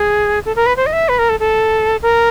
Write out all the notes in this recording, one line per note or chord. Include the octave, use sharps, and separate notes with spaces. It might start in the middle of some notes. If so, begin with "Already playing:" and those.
Already playing: G#4
A4
A#4
B4
C5
D#5
E5
B4
A#4
A4
A4
A#4